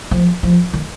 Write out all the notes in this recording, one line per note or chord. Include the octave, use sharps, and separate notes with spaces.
F3
F3
D#3